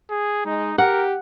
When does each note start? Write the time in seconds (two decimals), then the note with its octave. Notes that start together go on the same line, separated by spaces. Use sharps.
0.11 G#4
0.46 G#3 D#4
0.78 G4 A#4 F#5